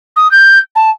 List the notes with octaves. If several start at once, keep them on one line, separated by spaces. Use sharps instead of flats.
D#6
G6
A5